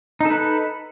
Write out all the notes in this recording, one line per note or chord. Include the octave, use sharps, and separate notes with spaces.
D#4 A4 B4